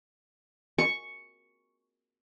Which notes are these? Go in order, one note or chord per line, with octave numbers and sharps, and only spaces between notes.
C#6